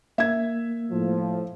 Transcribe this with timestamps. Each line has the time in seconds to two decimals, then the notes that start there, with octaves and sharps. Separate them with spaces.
0.18 A#3 E5 G#6
0.92 A2 F3